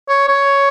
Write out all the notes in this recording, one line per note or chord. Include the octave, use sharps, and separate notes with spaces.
C#5
C#5